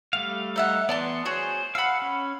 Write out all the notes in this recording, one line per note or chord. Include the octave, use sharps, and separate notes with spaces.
G3 A3 F5
D#4 E5 F#5
E3 B3 D5 A5 C6
F#4 G#4 C5 C#5
F5 F#5 B5 E6
C#4